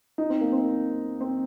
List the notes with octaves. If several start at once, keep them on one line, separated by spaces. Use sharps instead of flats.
D#4
C4
A#3
C4
C4